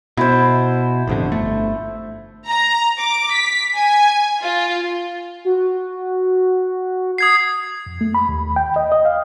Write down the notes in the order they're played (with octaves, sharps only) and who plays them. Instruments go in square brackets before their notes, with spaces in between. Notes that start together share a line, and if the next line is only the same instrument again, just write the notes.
[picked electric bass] B2 [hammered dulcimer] E4 C5
[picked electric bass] A1 F2 D3
G1 A3
[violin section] A#5
D6
B6
G#5
F4
[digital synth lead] F#4
[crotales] D#6 G#6 C7
[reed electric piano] F2
A3
B5
D#2
G5
D#5
D#5
F5